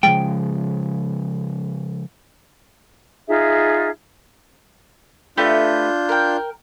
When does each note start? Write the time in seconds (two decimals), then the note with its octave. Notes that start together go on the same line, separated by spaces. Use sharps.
0.03 C#3 F3 G#3 G5
3.27 D#4 F4 G#4 E5
5.37 A3 D4 F4 G4 B4 G6
6.09 A#4 G5